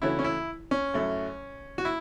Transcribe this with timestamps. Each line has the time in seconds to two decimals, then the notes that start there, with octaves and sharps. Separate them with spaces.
0.02 C#3 E3 A3 E4 F#4 C#5
0.19 C#4
0.24 E4
0.71 C#4
0.94 F#2 F#3 A3 E4
1.78 F#4
1.85 E4